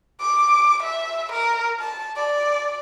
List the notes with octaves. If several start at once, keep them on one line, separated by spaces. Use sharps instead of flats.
D6
E5
A#4
A5
D5